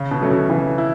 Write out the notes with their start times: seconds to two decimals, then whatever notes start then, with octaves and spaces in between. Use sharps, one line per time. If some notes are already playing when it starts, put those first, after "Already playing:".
Already playing: C#3
0.11 B2
0.21 F#3 A3 C#4
0.31 B2
0.50 C#3 E3
0.78 E4